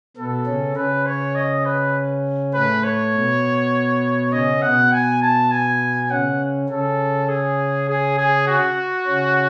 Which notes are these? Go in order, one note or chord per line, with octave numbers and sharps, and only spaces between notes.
B2 B3 A4
C#3 C#4
C#3 C#4 B4
C#5
D#5
B4
A2 A3 B4
C#5
B2 B3
C#3 C#4 D#5
B2 B3 F#5
G#5
A5
G#5
C#3 C#4 F#5
C#3 C#4 A4
G#4
G#4
G#4
F#4
C#3 C#4